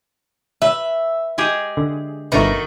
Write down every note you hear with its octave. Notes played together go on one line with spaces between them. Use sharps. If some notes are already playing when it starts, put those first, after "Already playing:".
B4 E5
G#3 G4 G#4
D3
G1 D3 D#3 A3 F#4 B4 A#5